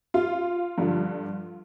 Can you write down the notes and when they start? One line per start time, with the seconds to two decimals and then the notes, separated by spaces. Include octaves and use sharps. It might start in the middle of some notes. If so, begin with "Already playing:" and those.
0.14 F4
0.78 G2 D3 F3